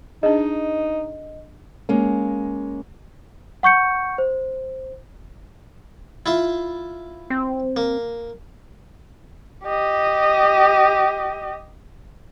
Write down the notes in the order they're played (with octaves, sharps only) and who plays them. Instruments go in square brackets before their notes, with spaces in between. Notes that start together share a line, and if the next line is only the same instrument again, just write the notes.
[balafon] D4 G#4 [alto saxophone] D#4 [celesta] D#5
[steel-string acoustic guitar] G#3 A#3 C#4
[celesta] F#5 C#6 G6 C#7
C5
[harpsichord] E4 F4 E5
[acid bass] C4
[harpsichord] A#3
[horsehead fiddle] G4 D#5